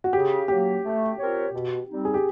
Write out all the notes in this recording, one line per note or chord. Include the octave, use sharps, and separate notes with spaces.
F#4
C#3 G4
F#3 A#3 G4
A3
C4 F4 A#4 C#5
B2
G3 C4 D#4
G#4
G4